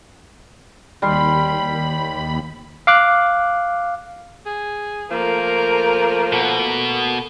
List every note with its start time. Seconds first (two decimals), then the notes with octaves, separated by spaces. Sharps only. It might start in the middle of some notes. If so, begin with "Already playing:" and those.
1.02 D#2 G3 B5 C6
2.87 F5 D6 F#6
4.46 G#4
5.11 F3 A3 A#3 A#4
6.33 B2